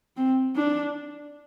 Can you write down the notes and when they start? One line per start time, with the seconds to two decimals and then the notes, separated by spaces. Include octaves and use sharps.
0.17 C4
0.56 D4